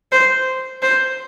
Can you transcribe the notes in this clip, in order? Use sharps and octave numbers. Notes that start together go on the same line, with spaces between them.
C5
C5